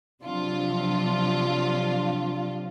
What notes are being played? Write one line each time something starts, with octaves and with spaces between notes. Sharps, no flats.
C3 F3 F#3 D4 F4